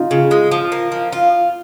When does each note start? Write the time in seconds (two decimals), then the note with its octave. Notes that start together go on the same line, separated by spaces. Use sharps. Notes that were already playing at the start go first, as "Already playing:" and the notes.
Already playing: D#4 F4
0.11 C#3
0.31 G#3
0.51 F3
0.72 A#3
0.92 F3
1.13 F4